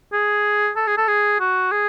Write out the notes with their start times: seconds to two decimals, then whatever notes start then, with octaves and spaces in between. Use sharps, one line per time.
0.13 G#4
0.76 A4
0.87 G#4
0.97 A4
1.08 G#4
1.40 F#4
1.72 G#4